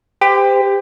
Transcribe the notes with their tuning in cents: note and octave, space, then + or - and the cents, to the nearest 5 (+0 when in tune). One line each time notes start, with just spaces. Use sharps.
G4 +20 C5 -35